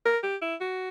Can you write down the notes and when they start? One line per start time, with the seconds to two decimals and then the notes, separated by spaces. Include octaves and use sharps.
0.05 A#4
0.23 G4
0.42 E4
0.61 F#4